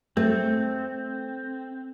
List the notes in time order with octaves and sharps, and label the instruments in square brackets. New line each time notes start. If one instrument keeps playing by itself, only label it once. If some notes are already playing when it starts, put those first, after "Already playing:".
[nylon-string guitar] A3 [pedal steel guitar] C4